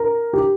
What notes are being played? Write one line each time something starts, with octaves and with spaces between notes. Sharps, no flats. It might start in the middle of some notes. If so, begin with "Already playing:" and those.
Already playing: A#4
G4